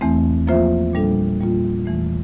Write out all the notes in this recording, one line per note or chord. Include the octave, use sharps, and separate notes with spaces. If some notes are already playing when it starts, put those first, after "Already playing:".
E2 E3 A3 C4
F3 A#3 F4 C5 E5
A#2 G3 D4 A4
A#2 G3 A#3 F4
E2 E3 A3